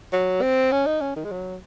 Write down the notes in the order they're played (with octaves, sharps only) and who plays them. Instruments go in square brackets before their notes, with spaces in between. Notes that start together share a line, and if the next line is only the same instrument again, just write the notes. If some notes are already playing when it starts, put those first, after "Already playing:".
[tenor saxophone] F#3
C4
C#4
D#4
C#4
D#3
G#3
F#3